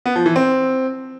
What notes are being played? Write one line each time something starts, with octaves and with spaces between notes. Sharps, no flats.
B3
F3
E3
C4